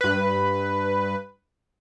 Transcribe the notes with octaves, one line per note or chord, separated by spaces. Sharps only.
G2 B4